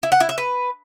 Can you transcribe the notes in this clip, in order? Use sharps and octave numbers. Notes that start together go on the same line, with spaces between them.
E4
F#5
E4
E5
B4